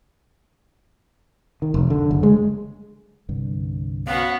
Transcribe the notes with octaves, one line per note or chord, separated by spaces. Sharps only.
D#3
F1
D3
F#1
G#3
C2 G2 D3
B3 C#4 F#4 F5